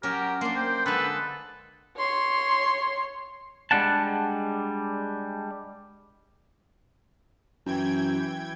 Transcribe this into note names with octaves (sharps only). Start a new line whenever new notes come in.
F#3 C#4 G4 A#4
A#3 D4 C6
C5 G5
D3 G#3 A4 B4
C#5 C6
G3 G#3 D4 F#5 A5
F#2 E3 G5 G#6